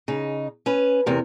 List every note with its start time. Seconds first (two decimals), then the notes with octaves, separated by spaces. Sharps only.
0.08 C#3 D#4
0.66 C#4 B4
1.06 E2 C3 A#4